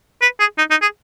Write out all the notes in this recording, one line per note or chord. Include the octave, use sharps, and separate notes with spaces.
B4
G#4
D#4
D#4
G#4